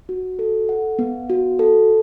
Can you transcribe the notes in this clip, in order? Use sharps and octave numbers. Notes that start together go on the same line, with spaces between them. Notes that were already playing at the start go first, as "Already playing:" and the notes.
F#4
A4
F#5
B3
F#4
A4